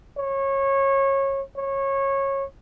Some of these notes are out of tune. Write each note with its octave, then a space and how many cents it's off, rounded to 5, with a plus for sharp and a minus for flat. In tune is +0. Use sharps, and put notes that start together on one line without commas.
C#5 -25
C#5 -20